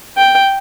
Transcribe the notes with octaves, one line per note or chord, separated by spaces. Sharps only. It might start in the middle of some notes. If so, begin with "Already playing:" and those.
G5